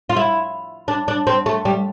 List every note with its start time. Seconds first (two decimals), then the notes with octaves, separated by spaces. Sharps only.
0.09 F4
0.16 E4
0.88 D4
1.08 D4
1.27 C4
1.46 A3
1.65 G3